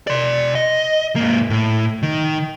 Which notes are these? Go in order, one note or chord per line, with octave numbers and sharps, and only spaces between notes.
D5 C6
D#5
G#2 A#3
A2
D#3